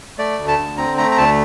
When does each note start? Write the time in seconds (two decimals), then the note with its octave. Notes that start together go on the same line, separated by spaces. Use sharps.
0.18 A3 D5
0.39 D2
0.48 A5
0.58 D3
0.78 C4 A#5
0.97 A3 A#5
1.11 A#5
1.18 D2 A5